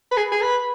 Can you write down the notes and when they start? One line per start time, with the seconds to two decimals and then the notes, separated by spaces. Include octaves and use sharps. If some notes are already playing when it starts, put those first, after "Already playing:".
0.11 B4
0.17 G#4
0.32 G#4
0.41 B4